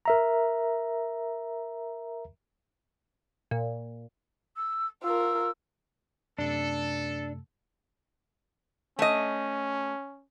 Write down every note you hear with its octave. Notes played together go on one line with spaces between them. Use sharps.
A#4 E5 A#5
A#2
E6
F4 A#4 E6
F#2 C3 A3 D4 A4
A3 C#4 D#5